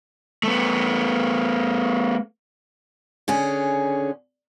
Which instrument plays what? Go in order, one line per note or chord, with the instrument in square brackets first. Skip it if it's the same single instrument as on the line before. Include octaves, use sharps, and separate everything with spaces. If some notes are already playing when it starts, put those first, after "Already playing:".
[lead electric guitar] A3 B3
[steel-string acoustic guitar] D3 C#4 G#4